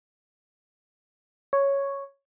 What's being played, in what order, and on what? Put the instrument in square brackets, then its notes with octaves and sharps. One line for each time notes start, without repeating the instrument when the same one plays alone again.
[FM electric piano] C#5